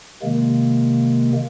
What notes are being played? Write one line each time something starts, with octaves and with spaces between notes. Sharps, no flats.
C3 D#3 G#3 A#3